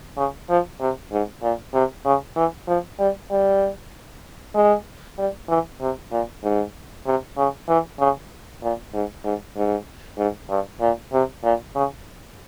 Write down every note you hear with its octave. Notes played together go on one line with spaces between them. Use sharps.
C#3
F3
C3
G#2
A#2
C3
C#3
E3
F3
G3
G3
G#3
G3
E3
C3
A#2
G#2
C3
C#3
E3
C#3
A#2
G#2
G#2
G#2
G#2
G2
A#2
C3
A#2
C#3